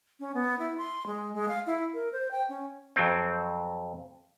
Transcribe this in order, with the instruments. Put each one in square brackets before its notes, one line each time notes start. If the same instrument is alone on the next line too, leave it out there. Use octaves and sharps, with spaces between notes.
[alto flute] C#4
B3
E4
C6
G#3
G#3
F5
E4
A#4
C5
G5
C#4
[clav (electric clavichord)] F2 F#3 C4